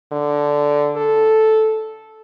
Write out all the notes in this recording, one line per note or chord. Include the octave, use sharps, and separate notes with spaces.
D3
A4